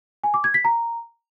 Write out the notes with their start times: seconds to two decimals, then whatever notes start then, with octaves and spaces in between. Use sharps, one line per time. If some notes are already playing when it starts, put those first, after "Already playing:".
0.24 G#5
0.34 D6
0.44 G#6
0.54 B6
0.65 A#5